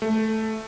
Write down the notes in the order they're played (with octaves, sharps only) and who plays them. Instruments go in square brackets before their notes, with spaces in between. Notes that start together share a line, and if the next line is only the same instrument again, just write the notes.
[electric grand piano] A3